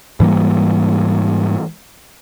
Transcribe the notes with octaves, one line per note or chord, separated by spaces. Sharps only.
G#2 E3 G3 A#3